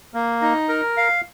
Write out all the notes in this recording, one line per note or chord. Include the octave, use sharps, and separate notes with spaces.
A#3
D#4
A#4
F5